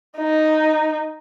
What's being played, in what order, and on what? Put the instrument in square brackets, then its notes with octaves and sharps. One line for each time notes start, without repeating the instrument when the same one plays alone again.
[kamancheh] D#4